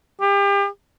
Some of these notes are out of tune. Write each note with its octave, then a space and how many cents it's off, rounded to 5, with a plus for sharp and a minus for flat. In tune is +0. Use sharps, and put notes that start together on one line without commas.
G4 +35